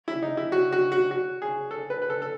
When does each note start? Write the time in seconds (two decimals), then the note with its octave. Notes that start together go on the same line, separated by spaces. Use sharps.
0.08 E4
0.22 D#4
0.37 E4
0.52 F#4
0.72 F#4
0.92 F#4
1.11 F#4
1.42 G#4
1.71 A4
1.90 B4
2.02 B4
2.10 A4
2.22 A4